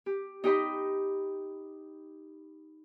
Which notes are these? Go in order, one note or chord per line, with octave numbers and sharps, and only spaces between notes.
G4
D#4 G4 D#5 B5